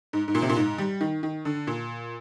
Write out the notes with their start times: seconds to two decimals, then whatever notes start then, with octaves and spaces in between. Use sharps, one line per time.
0.13 G#2
0.28 G#2
0.35 A#2
0.42 C3
0.49 A#2
0.56 G#2
0.78 G3
1.01 D#3
1.23 D#3
1.45 D3
1.67 A#2